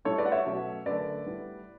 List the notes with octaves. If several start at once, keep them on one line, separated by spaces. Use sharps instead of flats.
A2 G3 C#4 A4 C#5
B4 D5
F#5
C#5 E5
B2 F#3 A3 C#4
F#2 D3 A3 B4 D5
A2 G3 B3